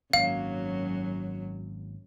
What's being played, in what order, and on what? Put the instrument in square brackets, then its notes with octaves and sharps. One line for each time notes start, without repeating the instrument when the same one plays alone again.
[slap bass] G#1 A#3 [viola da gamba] F#2 F#3 [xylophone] F5